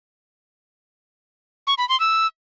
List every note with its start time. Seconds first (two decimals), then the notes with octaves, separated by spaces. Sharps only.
1.67 C#6
1.78 B5
1.89 C6
2.00 E6